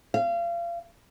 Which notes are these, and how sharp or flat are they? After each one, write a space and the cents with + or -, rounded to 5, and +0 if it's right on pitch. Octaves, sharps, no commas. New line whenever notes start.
F5 -30